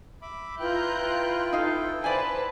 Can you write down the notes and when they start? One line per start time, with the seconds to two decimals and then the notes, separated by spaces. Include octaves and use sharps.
0.22 E5 B5 D6
0.60 E4 F4 B4 G5 A#5 F#6 G6
1.52 D#4 A4 F5
2.04 B4 C5 D5 G#5 A5